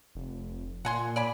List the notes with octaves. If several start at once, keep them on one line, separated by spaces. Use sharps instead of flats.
F1
A#2 F#5 G#5 C6
D5 G#5 B5